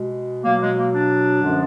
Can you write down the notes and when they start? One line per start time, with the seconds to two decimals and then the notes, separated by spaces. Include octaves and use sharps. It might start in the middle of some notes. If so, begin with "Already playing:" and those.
Already playing: B2 G#3
0.44 B2 F#3 A#3
0.60 G#3
0.76 A#3
0.92 D4
1.41 F#2 D3 F3 G#3